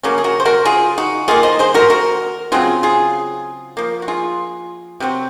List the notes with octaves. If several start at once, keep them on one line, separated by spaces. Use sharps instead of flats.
C#3 F#3 A#3 C#4
G#4
F#4 A#4
C5
F#4 A#4
F4 G#4
D#4 F#4
D#3 A#3 F4 G#4
C5 D#5
G#4 C5
F#4 A#4
F#4 A#4
C#3 F#3 C4 F4 G#4
F4 G#4
F3 A#3
F#4
F4 G#4
C3 F#3 C4